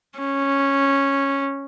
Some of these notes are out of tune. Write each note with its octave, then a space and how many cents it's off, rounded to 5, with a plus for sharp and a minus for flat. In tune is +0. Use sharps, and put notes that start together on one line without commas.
C#4 -5